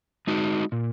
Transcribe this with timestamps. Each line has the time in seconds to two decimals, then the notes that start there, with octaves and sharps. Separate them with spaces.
0.27 G#3 D#4 F#4
0.72 A#2